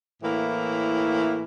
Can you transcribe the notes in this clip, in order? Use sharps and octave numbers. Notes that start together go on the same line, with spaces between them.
A2 E3 A#3 E4